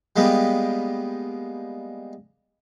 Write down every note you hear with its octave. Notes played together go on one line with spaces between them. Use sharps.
G3 G#3 A#3 B3 G4